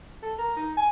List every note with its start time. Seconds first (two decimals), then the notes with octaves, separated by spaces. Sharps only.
0.22 A4
0.38 A#4
0.56 D#4
0.77 G#5